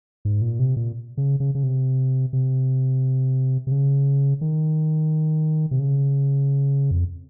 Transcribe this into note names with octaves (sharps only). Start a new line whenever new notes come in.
G#2
A#2
C3
A#2
C#3
C#3
C#3
C3
C3
C3
C#3
D#3
C3
C#3
F2